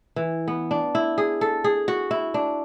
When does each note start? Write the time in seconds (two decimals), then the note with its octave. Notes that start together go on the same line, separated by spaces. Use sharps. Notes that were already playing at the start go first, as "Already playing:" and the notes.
0.16 E3
0.48 B3
0.71 D4
0.95 E4
1.18 G#4
1.41 A4
1.64 G#4
1.88 F#4
2.11 E4
2.34 D4